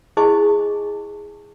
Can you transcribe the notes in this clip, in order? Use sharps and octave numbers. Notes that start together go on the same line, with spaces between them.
E4 G#4 C5 D#5 G#5 C#6